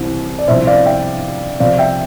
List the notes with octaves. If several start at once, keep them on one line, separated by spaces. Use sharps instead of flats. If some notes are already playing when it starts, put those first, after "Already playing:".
Already playing: C2 C3 E3
D5
C2 C3 F3 C5 E5
D5 F5
E5 G5
C3 F3 C4 D5 F5
E5 G5